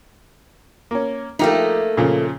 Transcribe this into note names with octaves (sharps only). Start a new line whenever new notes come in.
A#3 C#4
F3 A3 A#3 D#4 G4
A#2 C#3 F3